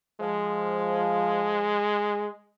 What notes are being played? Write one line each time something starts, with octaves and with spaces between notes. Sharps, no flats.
F3 G#3